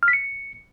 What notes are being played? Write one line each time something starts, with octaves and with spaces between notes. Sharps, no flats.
F6
B6
C#7